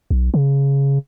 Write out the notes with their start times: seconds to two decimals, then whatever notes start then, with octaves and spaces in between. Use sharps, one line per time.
0.11 B1
0.34 C#3